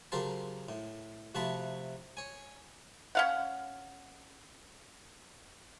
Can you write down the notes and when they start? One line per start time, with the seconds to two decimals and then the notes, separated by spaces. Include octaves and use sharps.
0.12 C#3 F#3 G4 A#4 C5 A5
0.69 A2
1.35 C3 F3 A3 F#4 A5 B5
2.17 C#5 G#5
3.15 C#4 F5 F#5